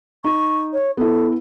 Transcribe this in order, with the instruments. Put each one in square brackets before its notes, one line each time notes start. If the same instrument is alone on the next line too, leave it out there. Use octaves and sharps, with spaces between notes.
[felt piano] D#4 [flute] C#6
[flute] C#5
[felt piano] B3 E4 [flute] A4